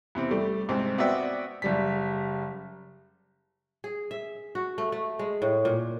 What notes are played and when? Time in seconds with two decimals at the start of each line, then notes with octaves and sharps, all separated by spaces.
0.15 E2 C3 C4
0.31 G3 A3
0.69 C2 G#2 C4
0.98 B3 C4 F#4 D5 E5 G5
1.62 F#1 G3 B6
3.84 G#4
4.11 E5
4.55 F#4
4.78 A3
4.92 A3
5.19 G#3
5.42 A2
5.65 A#2